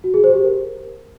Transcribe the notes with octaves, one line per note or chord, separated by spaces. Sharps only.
F#4
G#4
C5
G4
A#4